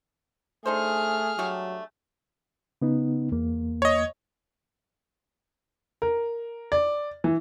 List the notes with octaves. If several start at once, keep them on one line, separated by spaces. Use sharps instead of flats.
A3 D4 D#4 G#4 C5 F6
F#3 G3 A3 D4
C#3 B3 D#4
E2 A#3
C#5 D#5
A#4
D5
E3